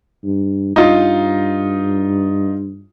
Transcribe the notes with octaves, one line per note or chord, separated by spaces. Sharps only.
G2
G2 D#4 F4